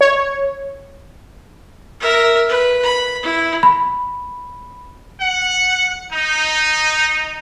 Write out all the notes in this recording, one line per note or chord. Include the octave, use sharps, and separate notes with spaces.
C#5
A#4 E5
B4
B5
E4
B5
F#5
D#4